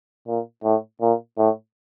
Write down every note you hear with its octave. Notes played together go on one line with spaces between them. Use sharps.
A#2
A2
A#2
A2